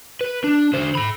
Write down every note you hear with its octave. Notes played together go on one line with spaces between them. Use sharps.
B4
D4
D3 C5
A4 B5